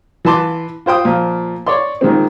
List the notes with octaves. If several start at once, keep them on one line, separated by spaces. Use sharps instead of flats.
E3 B4 A5 C6 D6
F4 C5 G5 D#6
A#2 F3
C#5 D5 C6
A#2 D#3 G#3 C4